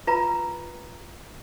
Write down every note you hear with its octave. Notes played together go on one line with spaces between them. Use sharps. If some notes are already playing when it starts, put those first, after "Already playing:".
F4 B4 A#5